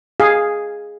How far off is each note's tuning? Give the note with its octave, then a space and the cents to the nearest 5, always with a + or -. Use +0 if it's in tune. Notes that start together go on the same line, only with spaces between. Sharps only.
G#4 +0 F5 +0